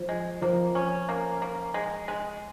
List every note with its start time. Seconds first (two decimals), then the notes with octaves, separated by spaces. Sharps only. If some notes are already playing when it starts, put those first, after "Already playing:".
Already playing: F3
0.09 G#3
0.42 F3 A#3
0.75 C#4
1.09 A#3
1.42 A#3
1.74 G#3
2.08 G#3